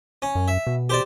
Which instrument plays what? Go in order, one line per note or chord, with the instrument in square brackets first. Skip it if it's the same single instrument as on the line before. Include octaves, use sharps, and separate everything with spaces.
[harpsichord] C#4
[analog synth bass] F#2
[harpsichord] E5
[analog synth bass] B2
[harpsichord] G4 C5 D5